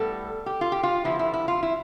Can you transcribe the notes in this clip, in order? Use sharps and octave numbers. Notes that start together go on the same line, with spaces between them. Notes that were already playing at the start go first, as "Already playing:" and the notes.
Already playing: A2 G3 B3 A4
G4
F4
G4
F4
D3 F3 B3 E4
E4
E4
F4
E4